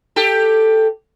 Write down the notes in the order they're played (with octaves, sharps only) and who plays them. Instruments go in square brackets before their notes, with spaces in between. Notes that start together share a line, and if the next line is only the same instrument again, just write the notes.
[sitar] G4 A4